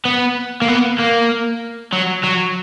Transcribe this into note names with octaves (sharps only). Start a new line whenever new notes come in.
B3
A#3
B3
A#3
F#3
F#3